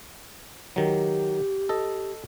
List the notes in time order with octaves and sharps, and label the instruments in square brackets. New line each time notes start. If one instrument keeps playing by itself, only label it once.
[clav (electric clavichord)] D#3 F#3 [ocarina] G4
[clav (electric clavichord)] A4 D#5